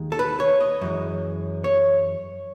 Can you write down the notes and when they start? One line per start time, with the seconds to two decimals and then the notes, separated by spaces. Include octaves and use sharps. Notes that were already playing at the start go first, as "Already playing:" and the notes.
Already playing: D#2 D#3 G#3
0.12 A4
0.19 B4
0.40 C#5
0.60 D#5
0.81 F#2 E3 G#3
1.64 C#5